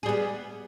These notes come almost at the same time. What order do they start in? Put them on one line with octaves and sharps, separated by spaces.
G#4 G3 B3